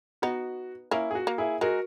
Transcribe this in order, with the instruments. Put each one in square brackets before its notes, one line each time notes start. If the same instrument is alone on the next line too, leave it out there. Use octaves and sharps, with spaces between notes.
[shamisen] B3 D#4 [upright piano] F#4
[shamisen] A#3 C#4 [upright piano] E4
[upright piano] G#4
F#4
[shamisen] A#3
[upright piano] E4 G#4
[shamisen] G#3 [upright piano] F#4 A#4